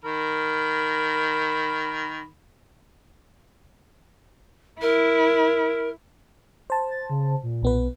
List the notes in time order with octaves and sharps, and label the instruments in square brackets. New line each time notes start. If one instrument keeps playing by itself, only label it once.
[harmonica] D#3 A#4 B5
[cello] E4 [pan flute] A#4
[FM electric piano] C5 A5
[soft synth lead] A6
C#3
A#2
[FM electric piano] B1 B3 B4